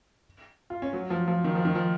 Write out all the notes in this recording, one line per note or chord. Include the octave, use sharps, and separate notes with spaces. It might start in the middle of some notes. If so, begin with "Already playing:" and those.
F4
C#4
F#3
F3
F3
D#3
F3
D#3
F3